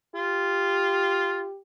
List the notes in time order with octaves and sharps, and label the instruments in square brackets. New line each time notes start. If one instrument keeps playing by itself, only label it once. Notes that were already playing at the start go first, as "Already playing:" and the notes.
[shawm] F4 [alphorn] G4